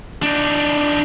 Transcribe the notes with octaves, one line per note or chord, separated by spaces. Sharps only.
D4 D#4